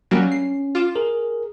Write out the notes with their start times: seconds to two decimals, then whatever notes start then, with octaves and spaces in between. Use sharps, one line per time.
0.11 F#3 G3 A#3 C#4
0.32 C7
0.75 F4 D6 E7
0.95 G#4 A#4